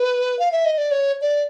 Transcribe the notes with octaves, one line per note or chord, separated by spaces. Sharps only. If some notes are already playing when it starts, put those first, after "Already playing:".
Already playing: B4
F5
E5
D#5
D5
C#5
D5